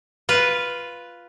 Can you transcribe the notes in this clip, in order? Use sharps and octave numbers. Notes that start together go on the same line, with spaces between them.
F4 B4